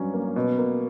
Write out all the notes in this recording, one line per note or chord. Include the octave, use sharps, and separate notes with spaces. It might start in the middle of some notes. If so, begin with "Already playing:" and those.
Already playing: G2 F#3 C#4
A#3
B2
A#3